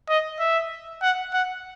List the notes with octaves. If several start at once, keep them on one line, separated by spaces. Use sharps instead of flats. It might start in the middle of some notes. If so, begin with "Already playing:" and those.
D#5
E5
F#5
F#5